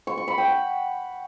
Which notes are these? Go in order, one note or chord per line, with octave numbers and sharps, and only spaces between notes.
C#6
C#6
B5
G5
F#5